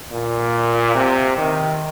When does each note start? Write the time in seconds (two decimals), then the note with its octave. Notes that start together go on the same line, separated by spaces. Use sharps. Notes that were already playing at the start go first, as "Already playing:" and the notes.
0.12 A#2
0.95 C3
1.38 D#3